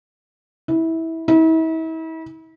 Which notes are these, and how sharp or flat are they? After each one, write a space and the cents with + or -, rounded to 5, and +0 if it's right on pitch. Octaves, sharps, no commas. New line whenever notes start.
E4 -20
E4 -40